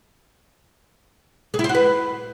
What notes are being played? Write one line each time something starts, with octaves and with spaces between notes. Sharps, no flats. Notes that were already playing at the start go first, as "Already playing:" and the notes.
G#4
E4
C5
F#4
B4